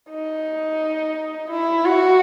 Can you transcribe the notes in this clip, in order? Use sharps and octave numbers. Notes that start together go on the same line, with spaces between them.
D#4
E4
F#4